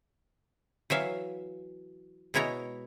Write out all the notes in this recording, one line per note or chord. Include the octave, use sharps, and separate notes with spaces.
E3 F#3 E5 F5
B2 G#3 E4 C#5 A#5